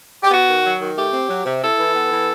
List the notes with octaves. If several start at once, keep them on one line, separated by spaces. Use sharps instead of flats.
G4
B3 F#4
D#3
F#3
D#3
A3 G4
C4
F#3
C3
E4 A4
E3
B3
E3